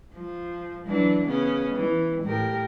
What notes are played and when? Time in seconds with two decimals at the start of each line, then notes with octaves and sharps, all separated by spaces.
0.14 F3
0.87 E3 F#3 D4
1.24 C#3 B3 C#4
1.74 E3
2.24 A2 G4 A#4